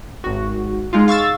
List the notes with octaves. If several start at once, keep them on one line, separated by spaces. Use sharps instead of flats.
G#1 F#4
G#3 D#4 F4
F5 C#6 E6 A6